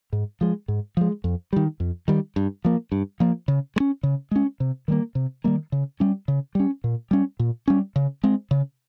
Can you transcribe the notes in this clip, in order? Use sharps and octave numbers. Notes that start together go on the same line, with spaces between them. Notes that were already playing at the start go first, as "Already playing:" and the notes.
G#2
F3 G#3
G#2
F3 G#3
F2
D#3 G3
F2
D#3 G3
G2
F3 A#3
G2
F3 A#3
C#3
G#3
C#4
C#3
G#3 C#4
C3
D#3 G3 A#3
C3
D#3 G3 A#3
C#3
G3 C#4
C#3
G3 C#4
A#2
G3 C#4
A#2
G3 C#4
C#3
G#3 C4
C#3